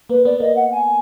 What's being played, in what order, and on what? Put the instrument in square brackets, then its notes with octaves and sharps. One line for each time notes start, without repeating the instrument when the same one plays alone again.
[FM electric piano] A#3 [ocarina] B4
[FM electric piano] B3 [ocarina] D5
[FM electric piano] A#3 [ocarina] D#5
[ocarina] F#5
G#5